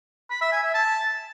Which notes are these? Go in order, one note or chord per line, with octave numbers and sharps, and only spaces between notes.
B5
E5
G#5
E5
A5